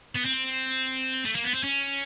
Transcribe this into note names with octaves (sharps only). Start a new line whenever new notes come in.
B3
C4
A3
A#3
B3
C4
C#4